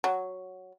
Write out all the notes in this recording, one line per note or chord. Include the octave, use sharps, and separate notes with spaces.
F#3